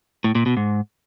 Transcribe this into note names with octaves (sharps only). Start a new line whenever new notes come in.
A2
A#2
B2
G#2